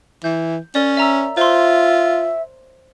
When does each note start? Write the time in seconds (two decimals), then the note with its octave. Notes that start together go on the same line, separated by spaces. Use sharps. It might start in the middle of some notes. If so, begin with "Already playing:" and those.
0.24 E3 G6
0.75 C#4 A#4 C#5 D5
0.97 E5 A#5 E6
1.37 F4 C5 E5 C6